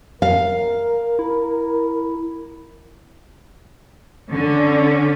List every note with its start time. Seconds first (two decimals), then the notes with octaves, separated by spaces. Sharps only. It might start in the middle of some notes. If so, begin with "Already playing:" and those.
0.22 A#4 F5
1.19 E4
4.31 D3 C#4